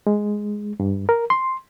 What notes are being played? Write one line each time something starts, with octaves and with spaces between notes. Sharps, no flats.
G#3
G2
A#4
C6